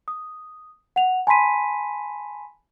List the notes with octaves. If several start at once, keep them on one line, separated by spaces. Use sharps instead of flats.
D#6
F#5 F7
G#5 A5 B5 C6 B6 D#7